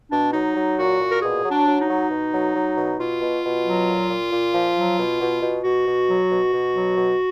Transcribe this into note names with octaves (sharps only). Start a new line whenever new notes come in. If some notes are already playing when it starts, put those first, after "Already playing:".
B2 D4
F#3 D#4
F#3
A#2 F#4
A#2
A#4
B2 G#4
F#3
D4
F#3
D#4
F#3
B2
F#3
F#3
B2
B2 F4
B2
B2
F#3
A#2
A#2
A#2
F3
F#3
B2
B2
B2
B2 F#4
B2
F#3
B2
B2
F#3
B2